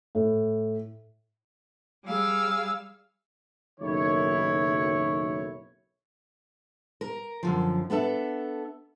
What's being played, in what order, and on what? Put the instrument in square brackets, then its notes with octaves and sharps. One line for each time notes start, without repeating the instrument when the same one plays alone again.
[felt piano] A2
[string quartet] G3 G#4 F5 E6
[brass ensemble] F#1 B1 D#3 E4 C#5
[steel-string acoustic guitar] A#4
F#2 D3 F3
B3 D4 A4 E5